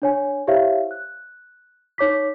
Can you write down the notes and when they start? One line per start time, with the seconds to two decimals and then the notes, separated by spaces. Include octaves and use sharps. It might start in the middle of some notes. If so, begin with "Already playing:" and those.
0.02 D4 C#5 G#5
0.47 E4 G4 C5 C#5 E5 F5
0.91 F#6
1.98 D#4 C#5 D6 B6